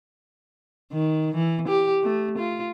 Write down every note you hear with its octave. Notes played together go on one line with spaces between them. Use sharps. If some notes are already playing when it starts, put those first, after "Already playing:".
D#3
E3
G4
A3
F4